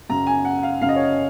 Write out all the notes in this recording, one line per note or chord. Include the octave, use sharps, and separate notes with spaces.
F#2 C#3 A#5
G#5
F#5
F5
F#2 C#3 F5
D#5
C#5
D#5